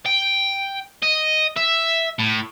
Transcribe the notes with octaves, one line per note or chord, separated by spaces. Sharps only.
G5
D#5
E5
A2